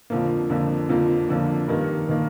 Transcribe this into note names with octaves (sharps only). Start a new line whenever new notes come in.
F2 D3 F3 A#3
F2 D3 F3 A#3
F2 D3 F3 A#3
F2 D3 F3 A#3
G2 D#3 A#3
D#3 A#3